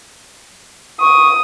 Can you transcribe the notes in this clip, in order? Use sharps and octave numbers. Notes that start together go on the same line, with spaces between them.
C#6 D#6